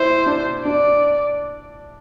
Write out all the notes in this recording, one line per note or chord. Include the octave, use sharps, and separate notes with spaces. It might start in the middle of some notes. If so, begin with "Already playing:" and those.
Already playing: E4 C5
D4
D4 D5